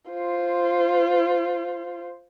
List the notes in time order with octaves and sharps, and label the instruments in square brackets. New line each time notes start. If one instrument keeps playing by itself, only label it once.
[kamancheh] F4 C5